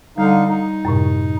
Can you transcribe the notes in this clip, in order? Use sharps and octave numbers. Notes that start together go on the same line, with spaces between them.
D3 G3 D#4 F5
D#4
F#2 A2 C3